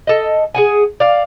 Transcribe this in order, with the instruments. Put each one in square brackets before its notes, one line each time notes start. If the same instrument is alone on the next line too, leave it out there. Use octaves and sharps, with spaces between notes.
[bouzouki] A4 D#5
G#4 F#5 G#5
D5 F5